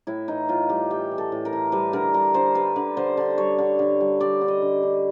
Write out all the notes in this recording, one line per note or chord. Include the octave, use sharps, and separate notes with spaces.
A2 E4
E3 D#4
A2 F4
G3 G4
E3 G4
E3
A4
A2
A#4
E3
G3 B4
D3 A#4
G3 A#4
D3 C5
G3 B4
D3
D3 C5
D3
G3 C#5
D3
D3
G3
G3 D5
D3
D#5
D3
D3